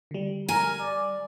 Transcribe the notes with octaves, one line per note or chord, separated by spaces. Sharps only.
D3 G3
A#4 G#5
D5